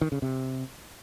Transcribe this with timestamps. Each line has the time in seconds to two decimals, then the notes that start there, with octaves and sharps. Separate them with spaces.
0.01 D#3
0.12 C#3
0.22 C3